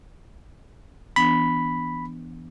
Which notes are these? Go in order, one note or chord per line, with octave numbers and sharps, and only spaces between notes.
E3 B3 D4 B5